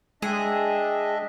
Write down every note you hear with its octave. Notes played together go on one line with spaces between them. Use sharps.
G#3 D4 G#4 D#5 E5 G5